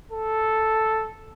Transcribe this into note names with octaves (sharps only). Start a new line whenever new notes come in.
A4